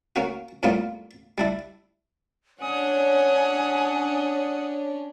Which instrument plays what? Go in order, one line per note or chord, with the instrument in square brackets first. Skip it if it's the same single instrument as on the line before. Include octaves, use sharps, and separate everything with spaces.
[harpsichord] A#3 C#4 F#4
F2 A2 G3 A#3 B3 F4
G3 D4 E4
[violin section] C#4 D4 [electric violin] F#5 D#6 [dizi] G#5